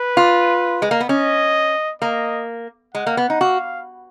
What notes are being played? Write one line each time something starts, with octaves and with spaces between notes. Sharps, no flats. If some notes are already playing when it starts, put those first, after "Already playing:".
Already playing: B4
F4
G#3
A#3
B3
C#4 D#5
A#3 D#5
G#3 F#5
A#3
B3
D#4
F#4 F5